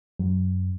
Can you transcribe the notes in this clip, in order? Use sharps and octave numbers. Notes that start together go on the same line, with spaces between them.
F#2